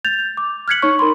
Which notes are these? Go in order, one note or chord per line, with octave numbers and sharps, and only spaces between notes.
G6 A6 F7
D6
F6 F#6 G#6 B6 C#7 F#7
D#4 C#5 C#6
D#4 A#4 B5 C6